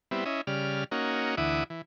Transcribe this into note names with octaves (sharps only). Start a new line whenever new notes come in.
G3 B3 C4 E4
C#4 E4 D#5
C#3 G3 D5 F6
A#3 C#4 D#4 F#4
D2 E3 E4 F#5 D6 D#6
E3